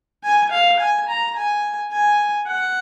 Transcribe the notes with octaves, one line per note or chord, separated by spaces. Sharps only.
G#5
F5
G#5
A#5
G#5
G#5
F#5